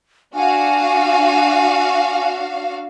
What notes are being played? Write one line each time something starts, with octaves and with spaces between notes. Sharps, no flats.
D4 F#4 F5 G#5